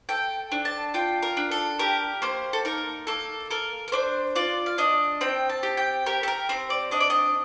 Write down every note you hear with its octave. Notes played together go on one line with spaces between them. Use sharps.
A4 G5
D4
A5
F4 G5
A#4
D4
A4
G4 A#4
A#3 C5
A4
D#4 A#4
A#3 A4
A4 A#4
A#4
D4 C5
F4 D5
F5
D4 D#5
C4 G5
A5
G4
G5
G4 A#4
A4
A#4
C4 C5
D5
D4 D#5
D5
D#5